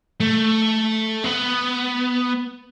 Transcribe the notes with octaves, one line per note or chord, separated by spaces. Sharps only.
A3
B3